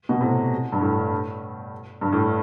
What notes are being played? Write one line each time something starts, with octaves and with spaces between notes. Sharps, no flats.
B2
A2 C3
G2
A2
G2
A2